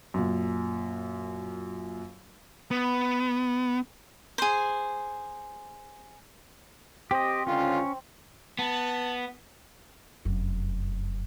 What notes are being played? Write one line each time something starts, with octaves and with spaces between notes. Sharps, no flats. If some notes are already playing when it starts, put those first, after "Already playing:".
F#2 A#2
B3
G#4 C5
C4 G4 D#5
C#2 D3 C#4 F4
B3 A5
F1 F#2